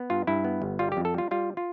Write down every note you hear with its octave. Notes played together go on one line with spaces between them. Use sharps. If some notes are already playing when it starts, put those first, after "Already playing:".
Already playing: B3
G2 F4
G2 E4
B3
G1
G3 F4
G4
F2
A4
G3 F4
G3 F4
F4